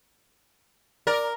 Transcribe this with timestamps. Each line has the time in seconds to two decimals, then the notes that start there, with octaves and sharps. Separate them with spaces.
1.07 A#4 D5